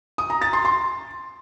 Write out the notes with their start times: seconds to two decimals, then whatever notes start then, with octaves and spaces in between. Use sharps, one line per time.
0.18 D#6
0.30 A#5
0.42 A6
0.53 C6
0.65 C6